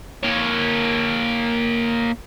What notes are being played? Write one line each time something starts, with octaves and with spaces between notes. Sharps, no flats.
A#3 C#5